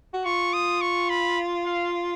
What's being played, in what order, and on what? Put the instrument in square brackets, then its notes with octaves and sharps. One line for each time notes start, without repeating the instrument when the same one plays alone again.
[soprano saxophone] F#4
[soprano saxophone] F4 [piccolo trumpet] C#6
[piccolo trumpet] D#6
C#6
B5
F5